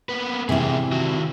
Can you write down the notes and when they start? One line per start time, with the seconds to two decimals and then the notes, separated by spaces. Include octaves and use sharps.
0.09 A#3 B3 B4
0.49 G#2 C3 E3 E4 G#4
0.92 D#3 F#4